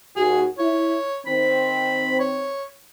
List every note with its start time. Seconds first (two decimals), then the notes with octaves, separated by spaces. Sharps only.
0.16 D#2 F#4 G#4
0.58 E4 C#5
1.26 D#3 C4 B5
2.19 C#5